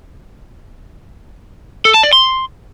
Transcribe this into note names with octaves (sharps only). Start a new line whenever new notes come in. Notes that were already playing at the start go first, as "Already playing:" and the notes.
A4
A5
D5
C6